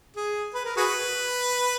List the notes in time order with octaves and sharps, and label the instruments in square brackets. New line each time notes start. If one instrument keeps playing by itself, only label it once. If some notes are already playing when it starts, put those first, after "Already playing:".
[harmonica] G#4
B4
A#4
F#4 G#4 B4